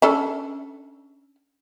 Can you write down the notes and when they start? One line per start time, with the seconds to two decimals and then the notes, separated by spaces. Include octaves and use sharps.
0.02 C#4 D4 A4